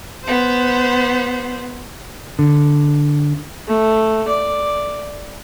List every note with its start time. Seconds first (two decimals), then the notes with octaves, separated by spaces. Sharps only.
0.24 B3 C5
2.39 D3
3.68 A3
4.28 D5